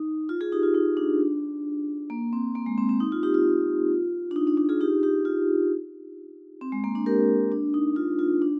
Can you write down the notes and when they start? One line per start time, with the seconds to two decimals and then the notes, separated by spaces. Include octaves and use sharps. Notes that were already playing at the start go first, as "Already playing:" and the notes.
Already playing: D#4
0.29 F4
0.41 F4 G#4
0.52 D#4 G4
0.63 F4
0.75 D#4
0.97 D4
2.10 A#3
2.33 C4
2.55 A#3
2.66 G#3
2.78 C4
2.89 C4
3.00 D#4
3.12 F4
3.23 D#4 G4
3.34 F4
4.31 D4
4.36 D#4
4.47 D4
4.57 D4
4.69 F4 G#4
4.81 D#4 G4
5.03 D#4 G4
5.25 F4
6.61 C4
6.72 G#3
6.84 A#3
6.95 D4
7.06 G4 A#4
7.52 D4
7.74 D#4
7.96 F4
8.19 F4
8.42 D4